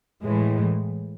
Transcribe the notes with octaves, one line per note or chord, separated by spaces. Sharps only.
A2 E3 G#3